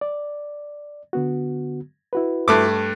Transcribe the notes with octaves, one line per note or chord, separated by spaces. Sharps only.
D5
D3 B3 F#4
E4 F#4 B4
G2 A3 D6